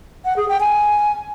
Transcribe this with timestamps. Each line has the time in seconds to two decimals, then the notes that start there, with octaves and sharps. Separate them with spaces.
0.25 F#5
0.37 G#4
0.49 G5
0.60 G#5